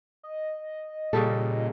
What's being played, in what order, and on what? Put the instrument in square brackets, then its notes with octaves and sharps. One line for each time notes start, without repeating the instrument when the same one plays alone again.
[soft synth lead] D#5
[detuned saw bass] A#2 [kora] C#3 G3 A4